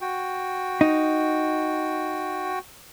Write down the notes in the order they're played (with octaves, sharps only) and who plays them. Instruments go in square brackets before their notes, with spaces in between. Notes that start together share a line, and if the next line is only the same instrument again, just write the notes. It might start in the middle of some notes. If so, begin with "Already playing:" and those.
[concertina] F#4 G5
[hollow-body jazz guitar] D#4